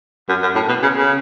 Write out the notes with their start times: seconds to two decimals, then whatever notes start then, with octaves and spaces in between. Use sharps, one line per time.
0.29 F#2
0.42 F#2
0.55 A2
0.68 B2
0.82 C#3
0.96 C#3